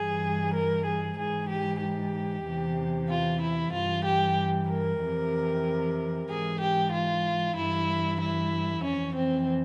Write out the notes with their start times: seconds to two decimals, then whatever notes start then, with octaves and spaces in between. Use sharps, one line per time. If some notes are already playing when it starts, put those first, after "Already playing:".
Already playing: G2 E3 G#4
0.54 A#4
0.86 G#4
1.17 G#2 E3 G#4
1.50 G4
1.82 G4
2.46 E2 C3 E3
3.09 F4
3.41 E4
3.73 G2 E3 F4
4.05 G4
4.69 A#4
5.00 F2 C3 E3
6.28 G#2 E3 G#4
6.61 G4
6.92 F4
7.56 G2 E3 E4
8.20 E4
8.84 F2 E3 C#4
9.16 C4